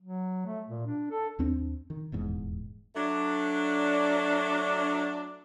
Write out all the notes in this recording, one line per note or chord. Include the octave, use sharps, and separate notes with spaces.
F#3
A3
A#2
D4
A4
D#2 C4 D4
D#3
D#1 E2 G#2
F#3 A3 D4